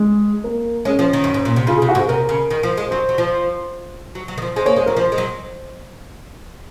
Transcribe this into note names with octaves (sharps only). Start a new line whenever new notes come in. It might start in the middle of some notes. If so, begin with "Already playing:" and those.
Already playing: G#3
A#3
G#3 C#4
F3
D#3
F#2
G#2
A#2
C3
C#3 F4
G#4
C3
F#4
G#2
G#4
C3 A#4
C#3
D#3
F3
G#3
F#3 C5
F#3
F3
F#3
F#3
D#3
F3
G#3 C5
A#3 C#5
G#3 C5
F#3 A#4
F3 C5
G#3
F#3